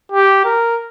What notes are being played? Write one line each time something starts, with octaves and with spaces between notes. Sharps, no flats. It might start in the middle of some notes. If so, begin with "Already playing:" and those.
G4
A#4